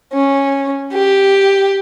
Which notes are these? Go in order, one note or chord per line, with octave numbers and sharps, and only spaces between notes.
C#4
G4